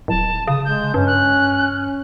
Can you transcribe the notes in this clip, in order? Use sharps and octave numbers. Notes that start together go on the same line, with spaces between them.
D1 A5
C#3 D#6
G#3 G6
G2 C#4
F#6